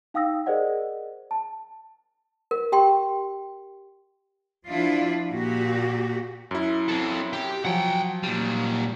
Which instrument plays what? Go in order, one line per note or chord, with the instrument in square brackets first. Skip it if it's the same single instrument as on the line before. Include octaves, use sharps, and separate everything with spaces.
[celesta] D#4 F5 G5 D#6 E6 A#6
G#4 A#4 C5 D5 D#5 F#5
A5
[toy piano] A#4
G4 G5 C6
[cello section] F3 D4 E4 F4
A#2 F#4 G4
[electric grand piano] F#2 E4
[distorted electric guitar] C4 A4
G4
[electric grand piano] F3 F#3 [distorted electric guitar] F#5 G5
[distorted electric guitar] A#2 G3